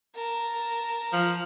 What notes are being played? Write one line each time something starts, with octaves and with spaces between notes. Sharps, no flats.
A#4 A5
F3